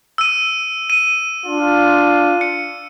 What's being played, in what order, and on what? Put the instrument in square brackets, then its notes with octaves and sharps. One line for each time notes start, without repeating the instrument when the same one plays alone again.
[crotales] E6 D#7
D#7
[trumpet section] D4 F4
[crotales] C#7